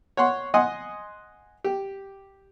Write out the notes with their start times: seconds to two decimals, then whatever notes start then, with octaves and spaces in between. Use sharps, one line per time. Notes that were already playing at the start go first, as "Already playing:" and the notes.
0.17 C#5 F#5 C6
0.54 D#5 F#5 G#5 C6 D#6
1.64 G4